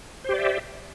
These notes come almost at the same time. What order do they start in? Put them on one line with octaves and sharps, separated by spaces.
C5 G4 D5 E5